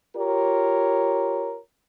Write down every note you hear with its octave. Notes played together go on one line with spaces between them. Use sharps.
F4 G4 A#4 C#5